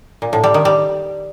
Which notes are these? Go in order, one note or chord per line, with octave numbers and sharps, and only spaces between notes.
A#2
A2
G3
D#3
G3